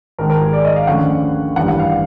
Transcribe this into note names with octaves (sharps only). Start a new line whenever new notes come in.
G#1 G#2 D#3 A#4
A#4
G#4
D5
D#5
F5
D#2 D3 F3 A3 C#4 F#5
A1 G2 D#3 G3 F#5
F#5
F5